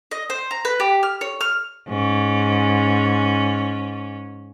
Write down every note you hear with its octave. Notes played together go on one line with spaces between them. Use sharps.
D#5
C5
A#5
B4
G4
F6
C#5
F6
G#2 C#4